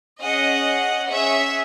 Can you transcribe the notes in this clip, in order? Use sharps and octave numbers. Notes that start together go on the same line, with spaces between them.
C#4 G#4 D#5 F#5
C#4 G#4 C#5 E5